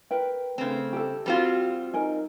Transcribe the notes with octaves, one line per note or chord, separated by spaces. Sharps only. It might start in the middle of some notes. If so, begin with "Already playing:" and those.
A#4 B4 G5
C#3 A3 C4
G4 A4
G3 C4 F4 F#4
D#4 A#4 G#5